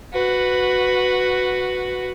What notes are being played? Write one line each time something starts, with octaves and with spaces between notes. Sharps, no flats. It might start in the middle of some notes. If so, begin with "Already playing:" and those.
F#4 B4